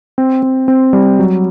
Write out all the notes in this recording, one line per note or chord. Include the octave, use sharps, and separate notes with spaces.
C4
C4
C4
G3
F#3